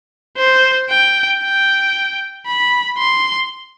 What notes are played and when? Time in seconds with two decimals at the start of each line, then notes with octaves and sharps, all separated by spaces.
0.38 C5
0.90 G5
1.43 G5
2.47 B5
2.99 C6